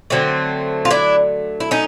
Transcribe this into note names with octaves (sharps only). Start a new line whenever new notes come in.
D3 F#3 A3 C4
F4
D4 E4
E4
C#4 D#4